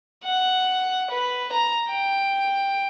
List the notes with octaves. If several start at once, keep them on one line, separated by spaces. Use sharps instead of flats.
F#5
B4
A#5
G5